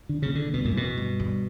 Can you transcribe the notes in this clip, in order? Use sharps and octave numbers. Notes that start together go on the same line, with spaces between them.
D3
A#2 C#3
D3
G2 B2
F#2 A#2
E2 B2
G2
G2